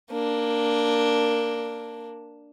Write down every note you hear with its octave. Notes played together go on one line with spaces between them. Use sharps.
A#3 D4